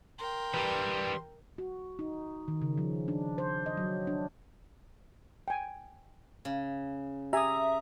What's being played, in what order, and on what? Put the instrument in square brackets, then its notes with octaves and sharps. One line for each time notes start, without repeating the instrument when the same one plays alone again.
[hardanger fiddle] A#4 G5 [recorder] C6
[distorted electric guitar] E3 G3 [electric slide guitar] G4 B4
[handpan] F#4
D#4
D#3
C#3
F3
D4
C5
D#5
F#3
D4
[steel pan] G5 G#5
[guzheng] C#3
[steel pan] G4 G#5 [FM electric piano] E5 [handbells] A#5 D#6